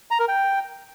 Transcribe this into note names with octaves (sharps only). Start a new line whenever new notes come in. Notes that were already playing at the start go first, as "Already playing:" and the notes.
A#5
A#4
G5